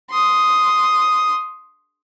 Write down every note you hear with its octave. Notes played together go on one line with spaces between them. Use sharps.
C6 D#6